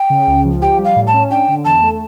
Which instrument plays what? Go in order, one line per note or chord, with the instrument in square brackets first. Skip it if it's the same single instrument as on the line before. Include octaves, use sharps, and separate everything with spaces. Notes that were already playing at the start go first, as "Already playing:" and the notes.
Already playing: [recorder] G5
[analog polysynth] C#3
C#2
F3
[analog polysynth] G4 [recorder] G5
[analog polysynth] G3
[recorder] F5
[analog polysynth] A2
[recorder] A5
[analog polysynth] C#4
[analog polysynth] D4 [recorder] G5
[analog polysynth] D3
[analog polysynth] E2 [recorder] A5
[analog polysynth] A3